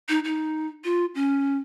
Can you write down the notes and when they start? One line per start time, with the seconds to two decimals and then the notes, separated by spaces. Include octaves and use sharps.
0.09 D#4
0.25 D#4
0.84 F4
1.15 C#4